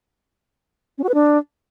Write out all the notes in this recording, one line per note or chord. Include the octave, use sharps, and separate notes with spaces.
C#4
F#4
B4
D4